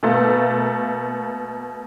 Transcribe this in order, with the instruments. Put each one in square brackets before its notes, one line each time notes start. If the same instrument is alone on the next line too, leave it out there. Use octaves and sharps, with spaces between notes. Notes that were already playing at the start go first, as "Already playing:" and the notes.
[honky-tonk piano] B2 A3 A#3